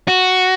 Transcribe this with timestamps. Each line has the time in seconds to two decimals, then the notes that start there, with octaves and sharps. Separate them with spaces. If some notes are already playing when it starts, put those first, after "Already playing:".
0.08 F#4